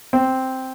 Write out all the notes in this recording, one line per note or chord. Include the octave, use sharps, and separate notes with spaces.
C4